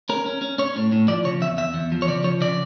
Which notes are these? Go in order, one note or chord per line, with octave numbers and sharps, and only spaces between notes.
C#4 A#4
C#4
C#4
C#4 C#5
A2
A2
F3 D5
C#3 C#5
E2 E5
E2 E5
E2
F3
C#5
C#3 D5
F3 C#5
C#3 D5